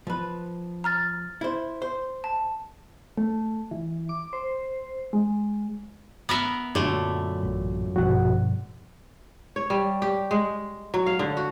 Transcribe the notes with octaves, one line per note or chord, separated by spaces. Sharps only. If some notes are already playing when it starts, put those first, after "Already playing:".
F3 B4
A#5 F6 A6
E4 C5
C5
A5
A3
E3
D6
C5
G#3
B3 A#4 E5
F#2 A#2 D3 F#3 A3
A1
A#1 G2 B2 F3 F#4 F#5
C#5
G3
G4
G#3
F#3
F5
D3
F#4